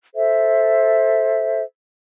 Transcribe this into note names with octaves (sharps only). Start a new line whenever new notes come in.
A4 C5 E5